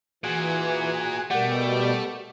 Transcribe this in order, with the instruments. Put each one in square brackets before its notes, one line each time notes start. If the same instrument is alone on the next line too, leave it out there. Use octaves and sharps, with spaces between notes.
[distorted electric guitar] A#2 [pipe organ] E3 [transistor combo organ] F#4 G#4
[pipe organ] B2 G3 [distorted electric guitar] A3 [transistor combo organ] G4 D5 [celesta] A#4 F#5